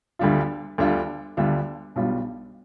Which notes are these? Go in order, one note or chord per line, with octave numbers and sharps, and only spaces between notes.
D2 D3 G3 D4 F4
D2 D3 G3 D4 F4
D2 D3 G3 D4 F4
B1 B2 G3 D4 F4